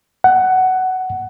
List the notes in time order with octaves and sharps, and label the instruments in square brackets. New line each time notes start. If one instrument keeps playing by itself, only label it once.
[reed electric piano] F#5